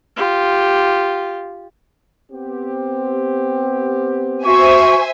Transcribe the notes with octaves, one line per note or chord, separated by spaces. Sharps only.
F4 G4
B3 C4 G4
F#4 C5 E5 G#5 C#6